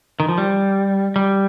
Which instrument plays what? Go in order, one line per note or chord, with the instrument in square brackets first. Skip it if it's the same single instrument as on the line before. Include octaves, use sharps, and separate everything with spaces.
[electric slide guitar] D#3
F3
G3
G3